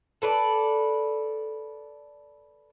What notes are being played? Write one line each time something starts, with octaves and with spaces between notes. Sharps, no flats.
A4 B4 D5